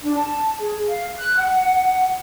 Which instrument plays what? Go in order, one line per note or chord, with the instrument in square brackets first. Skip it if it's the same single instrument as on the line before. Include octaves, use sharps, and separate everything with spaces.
[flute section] D4
A5
G#4
F5
F#6
F#5